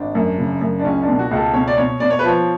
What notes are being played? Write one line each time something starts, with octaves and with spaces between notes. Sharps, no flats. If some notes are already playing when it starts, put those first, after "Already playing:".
Already playing: G#1 D4
F#2
C#3
F#2
D4
C#2 C#4
D4
B2
F#4
C#2
A4
B2 C#5
D5
B2 C#5
B2 D5
C#5
B4
F3 C#5